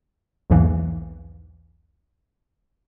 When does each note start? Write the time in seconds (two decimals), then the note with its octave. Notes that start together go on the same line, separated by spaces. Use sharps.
0.50 B1 E2 G#2 E3 A#3